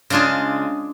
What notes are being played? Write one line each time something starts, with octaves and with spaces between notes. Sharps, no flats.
C#3 G#3 D4 F4 G#4